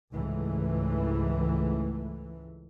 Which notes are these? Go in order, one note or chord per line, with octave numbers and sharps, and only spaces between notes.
C#2 G#2 E3 A3